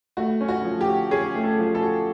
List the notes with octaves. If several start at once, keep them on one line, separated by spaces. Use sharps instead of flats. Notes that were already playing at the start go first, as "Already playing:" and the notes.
A3 F#4
C#4
F#4
F3
G4
F#4
C#4 G#4
A3
A4
F3
A4
F#4